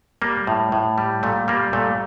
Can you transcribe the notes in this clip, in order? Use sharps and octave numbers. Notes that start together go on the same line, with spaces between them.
G3 A#3
A2
A2
G3
A#2 A3
G3 A#3
A#2 A3